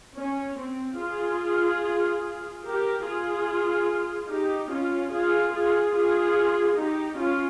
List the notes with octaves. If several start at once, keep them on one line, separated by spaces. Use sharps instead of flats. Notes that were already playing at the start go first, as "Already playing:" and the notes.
C#4
C4
F4 G#4
G4 A#4
F4 G#4
D#4 G4
C#4 F4
F4 G#4
F4 G#4
F4 G#4
D#4 G4
C#4 F4